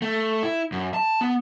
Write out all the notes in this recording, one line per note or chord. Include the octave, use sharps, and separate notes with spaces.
A3
E4
F#2
A5
B3